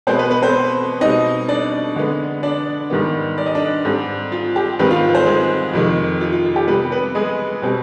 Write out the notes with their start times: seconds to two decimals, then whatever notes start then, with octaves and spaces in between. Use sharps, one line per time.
0.07 B2 G#3 B3 C4 C5
0.19 B3 B4
0.30 B3 B4
0.42 C4 C5
1.01 B2 G3 C4 D#4 D#5
1.48 D4 D5
1.96 D3 G#3 B3
2.43 D4 D5
2.90 G#2 D#3 G3 B3
3.38 D5
3.46 D#5
3.55 D4 D5
3.85 G#2 G3 C4
4.32 F4
4.56 G4
4.79 G#2 D#3 G3 B3 C4 B4
4.91 F4 F5
5.14 C4 C5
5.26 G#3 G#4
5.73 F2 C3 D#3 G#3
6.21 F4
6.32 F4
6.45 F4
6.56 G4
6.68 C3 G3 B3 B4
6.92 B3 B4
7.15 G#3 G#4
7.62 B2 G3 C4